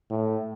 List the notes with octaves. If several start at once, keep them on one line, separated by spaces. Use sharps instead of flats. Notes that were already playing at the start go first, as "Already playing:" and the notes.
A2